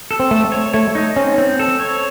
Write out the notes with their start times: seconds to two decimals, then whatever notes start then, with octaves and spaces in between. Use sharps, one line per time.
0.11 A4
0.20 C4
0.31 A3 A4
0.52 C#5
0.74 A3 C#5
0.95 D#4
1.16 C4 C#4
1.38 C4
1.59 A4
1.80 C#5